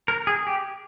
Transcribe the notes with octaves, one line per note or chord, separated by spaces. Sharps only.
A#4
G#4
G4